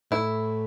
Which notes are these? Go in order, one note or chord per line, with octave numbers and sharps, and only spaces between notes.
A2 E4